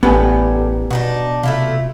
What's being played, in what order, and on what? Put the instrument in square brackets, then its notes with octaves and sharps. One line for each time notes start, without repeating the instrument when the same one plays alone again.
[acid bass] A1 [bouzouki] A2 G3 A#4 [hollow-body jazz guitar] B3 G#5 [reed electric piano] G4 B4
[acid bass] B2 [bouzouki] D4 D#4 F#4
[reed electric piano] C3 [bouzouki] A3 E4 F4